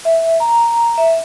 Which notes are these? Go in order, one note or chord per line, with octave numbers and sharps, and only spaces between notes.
E5
A#5
E5